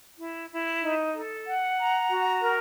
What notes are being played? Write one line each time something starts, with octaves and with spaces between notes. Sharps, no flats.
E4
E4
D#4
A4
F#5
A#5
F#4
A#4